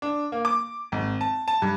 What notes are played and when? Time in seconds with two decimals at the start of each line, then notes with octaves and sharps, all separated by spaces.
0.02 D4
0.32 A#3
0.45 D6
0.92 G#1
1.21 A5
1.48 A5
1.62 G2